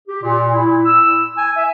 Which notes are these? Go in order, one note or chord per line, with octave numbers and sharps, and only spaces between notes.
G4
A#2
E4
E6
G#5
E5